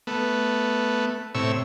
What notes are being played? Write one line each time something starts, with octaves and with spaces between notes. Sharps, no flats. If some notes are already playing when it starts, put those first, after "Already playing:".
A3 B3
A2 C3 C#5 E6